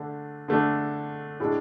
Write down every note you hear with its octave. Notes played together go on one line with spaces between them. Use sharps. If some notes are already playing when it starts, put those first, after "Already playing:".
Already playing: D3 A3 D4
D3 A3 D4
A2 G#3 D4